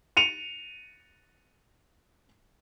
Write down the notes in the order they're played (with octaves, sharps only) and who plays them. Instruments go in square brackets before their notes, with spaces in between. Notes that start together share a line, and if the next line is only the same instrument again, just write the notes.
[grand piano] C#7 D#7 F7